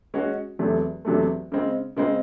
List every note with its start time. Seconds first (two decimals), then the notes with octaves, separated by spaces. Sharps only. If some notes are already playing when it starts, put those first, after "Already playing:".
0.14 G#3 C#4 F#4
0.59 E2 C3 F#3 A3
1.05 E2 C3 F#3 A3
1.52 C#3 G#3 C4
1.97 C#3 G#3 C4